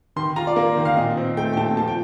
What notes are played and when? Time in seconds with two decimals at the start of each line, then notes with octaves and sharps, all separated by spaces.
0.16 D#3 C6
0.36 F4 A#5
0.47 D5
0.56 A#3
0.77 D#3
0.85 F5
0.97 A#2 D#5
1.17 C4
1.37 A3 G5
1.53 G5
1.57 A#2 A5
1.77 F3 A5
1.88 G5